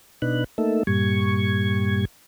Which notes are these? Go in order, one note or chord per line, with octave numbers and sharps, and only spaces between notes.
B2 D4 D#4 B4 F#6
A3 A#3 D#4 A4 E5
G2 A#2 G3 C#6 G#6